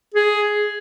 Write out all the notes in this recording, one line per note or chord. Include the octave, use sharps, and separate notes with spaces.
G#4